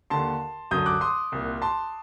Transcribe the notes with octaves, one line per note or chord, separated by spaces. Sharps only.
D#2 D3 A5 C6
F#2 D3 D#6 G6
D6 F#6
C6 D#6
C2 A#2
A5 C6